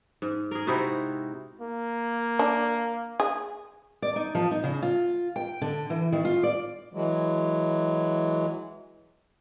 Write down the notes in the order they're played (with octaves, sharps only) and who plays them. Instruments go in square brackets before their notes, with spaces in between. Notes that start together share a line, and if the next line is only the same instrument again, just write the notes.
[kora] G#2
G#4 A#4
C3 D#4 E4 F#4
[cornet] A#3
[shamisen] D4
G#4
[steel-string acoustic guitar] D5
D#4
F3
D#4
C#3
F4
G5
D3
E3
D#3
F4
D5
[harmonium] E3 F#3 G#3